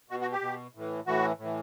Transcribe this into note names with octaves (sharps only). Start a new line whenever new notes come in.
B2 F#4
F#4
G4
B2
A2 E3
A2 E3 F#4
A2
E3